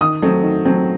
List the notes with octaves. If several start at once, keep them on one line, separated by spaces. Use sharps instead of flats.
D#3 D#6
F#3 A3 C4
D#3
F#3 A3 C4